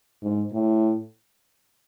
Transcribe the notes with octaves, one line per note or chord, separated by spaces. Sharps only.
G#2
A2